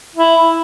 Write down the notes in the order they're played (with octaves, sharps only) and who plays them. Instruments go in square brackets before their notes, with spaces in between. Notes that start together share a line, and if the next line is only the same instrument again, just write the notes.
[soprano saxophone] E4